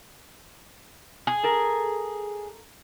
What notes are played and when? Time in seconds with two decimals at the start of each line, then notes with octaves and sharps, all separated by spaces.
1.27 G#4
1.43 A4 A#4